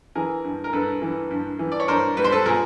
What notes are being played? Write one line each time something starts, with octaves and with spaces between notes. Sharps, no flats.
E3 G#4 A#4
G2
A#4
G2 A4 B4
E3
G2
E3
D5
C#5
G2 A#4 C5
G3 B4
C5
A4 B4
A#2 G#4 A#4